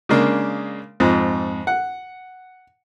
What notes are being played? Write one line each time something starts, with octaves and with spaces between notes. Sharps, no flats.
C#3 G#3 A#3 D4
F2 G#2
F#5